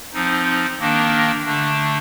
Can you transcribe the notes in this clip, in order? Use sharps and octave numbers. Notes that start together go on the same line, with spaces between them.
F3 C4 D#4
D#3 A#3 D4
D3 A3 D4